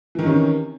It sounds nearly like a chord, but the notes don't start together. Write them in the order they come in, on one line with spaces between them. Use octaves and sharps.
E3 D#3 C3 C#4